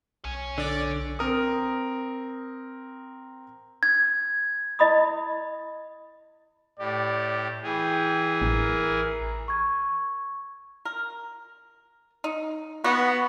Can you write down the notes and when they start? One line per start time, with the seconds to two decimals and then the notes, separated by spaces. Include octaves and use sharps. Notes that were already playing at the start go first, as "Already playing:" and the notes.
0.25 B1 C#5 G#5
0.58 D3 D5
1.19 C4 A#4 D#6
3.83 G#6
4.79 E4 D#5 B5 D#6
6.79 A2 G4 D5
7.63 E3 G#4 G5
8.41 A1 A#4
9.48 C#6 G#6
10.85 A#4
12.24 D#4
12.84 B3 F#4